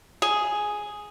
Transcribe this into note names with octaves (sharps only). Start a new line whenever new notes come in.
G#4